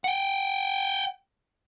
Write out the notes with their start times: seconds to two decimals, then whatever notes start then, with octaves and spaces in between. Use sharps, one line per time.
0.04 F#5 G5